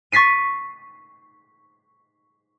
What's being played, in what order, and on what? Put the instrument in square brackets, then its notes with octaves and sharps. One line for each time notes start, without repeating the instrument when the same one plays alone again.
[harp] C#6 A6 B6 C7 D#7